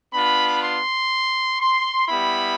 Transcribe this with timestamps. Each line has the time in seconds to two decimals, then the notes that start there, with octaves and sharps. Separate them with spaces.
0.12 B3 D4 F4 B5
0.61 C6
1.59 C6
2.07 G3 B3 E4 B5